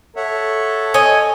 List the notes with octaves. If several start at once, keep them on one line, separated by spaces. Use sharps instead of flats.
A4 C#5 E5 F#5
C#5 D#5 G#5